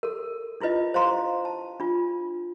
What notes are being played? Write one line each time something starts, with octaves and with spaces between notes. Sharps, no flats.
A4 A#4
D4 E4 F4 B4 D#5
C5 D#5 F5 A#5 C6
A5
D4 F4